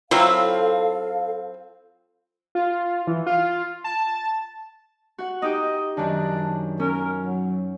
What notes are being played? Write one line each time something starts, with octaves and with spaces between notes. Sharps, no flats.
F#3 C4 E4 F4 A4 F5
F4
E3
F4
A5
F#4 F#5
D#4 G4 D#5 G5
F#2 D#3 D4
C#4 A#4
F#3